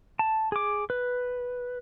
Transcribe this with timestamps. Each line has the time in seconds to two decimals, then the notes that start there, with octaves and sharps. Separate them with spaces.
0.19 A5
0.52 G#4 D6
0.90 B4